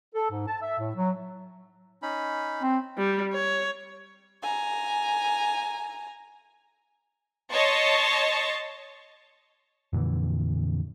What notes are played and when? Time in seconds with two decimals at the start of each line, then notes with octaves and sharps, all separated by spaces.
0.15 A4
0.30 G#2
0.47 A5
0.61 E5
0.79 A2
0.96 F#3
2.02 C#4 D#4 B5
2.62 C4
2.98 G3
3.33 C#5
4.42 G#5 A#5
7.51 C#5 D#5 A5 C6 C#6
9.93 F2 A#2 D3 E3